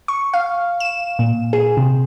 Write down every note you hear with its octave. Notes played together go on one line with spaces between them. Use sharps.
C#6
F5
E7
A#2
G#4
C3